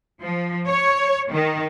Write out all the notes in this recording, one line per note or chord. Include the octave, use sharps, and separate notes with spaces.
F3
C#5
D#3